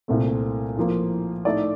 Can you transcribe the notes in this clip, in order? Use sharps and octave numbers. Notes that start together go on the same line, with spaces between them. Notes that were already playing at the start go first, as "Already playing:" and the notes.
C2 A#2 A3 C4
A2 F3 A#3
A2 A3 D#4 A4 D5